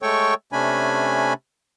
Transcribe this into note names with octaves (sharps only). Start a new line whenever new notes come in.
G#3 A3 A4 C#5 G5 C#6
C3 A3 C#4 D4 G#5 B5